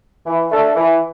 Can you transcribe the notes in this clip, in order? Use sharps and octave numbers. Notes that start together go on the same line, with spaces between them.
E3
A3 D4 A4
E3